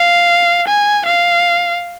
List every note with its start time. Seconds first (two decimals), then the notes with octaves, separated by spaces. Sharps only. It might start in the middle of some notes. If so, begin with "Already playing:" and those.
Already playing: F5
0.68 G#5
1.06 F5